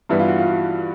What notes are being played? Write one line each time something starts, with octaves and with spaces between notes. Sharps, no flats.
G2 E3 G3 B3 E4
F4
F#4
F4
F#4